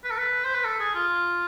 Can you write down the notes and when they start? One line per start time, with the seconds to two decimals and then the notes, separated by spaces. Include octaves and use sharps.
0.04 B4
0.11 A4
0.18 B4
0.44 C5
0.54 B4
0.64 A4
0.80 G#4
0.95 F4